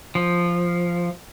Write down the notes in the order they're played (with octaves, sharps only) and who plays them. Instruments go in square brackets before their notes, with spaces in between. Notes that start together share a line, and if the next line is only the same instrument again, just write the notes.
[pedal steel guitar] F3